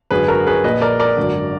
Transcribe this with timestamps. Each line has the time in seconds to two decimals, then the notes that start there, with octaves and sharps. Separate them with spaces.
0.11 G#1 F#2 D3 G#4 B4
0.28 F#4 A#4
0.47 G#4 B4
0.63 A#1 A#2 B4 D#5
0.81 A#4 D5
1.00 A#4 D5
1.16 G#1 F#2 D3